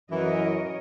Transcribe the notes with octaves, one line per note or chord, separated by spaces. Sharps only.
F#2 E3 A#4 C#5 D#5